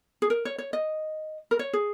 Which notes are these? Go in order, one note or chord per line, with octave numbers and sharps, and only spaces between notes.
G#4
A#4
C#5
C#5
D#5
A#4
C#5
G#4